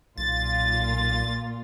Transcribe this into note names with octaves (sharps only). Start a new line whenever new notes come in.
B1 A#2 F4 A6